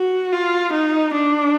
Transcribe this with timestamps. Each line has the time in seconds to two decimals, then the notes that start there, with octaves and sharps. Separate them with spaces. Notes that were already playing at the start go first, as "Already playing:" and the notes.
Already playing: F#4
0.32 F4
0.73 D#4
1.14 D4